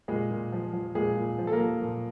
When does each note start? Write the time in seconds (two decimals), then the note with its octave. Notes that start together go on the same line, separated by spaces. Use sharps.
0.08 A#2 G#3 G#4
0.31 A#2
0.52 F3
0.73 F3
0.95 A#2 G#3 G#4
1.16 A#2
1.38 F3
1.47 A4
1.52 A#3 A#4
1.59 F3
1.81 A#2